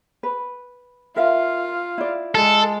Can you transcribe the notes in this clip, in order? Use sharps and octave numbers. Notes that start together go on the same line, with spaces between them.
B4
F4 A#4 E5 F5
E4 D5
G#3 A4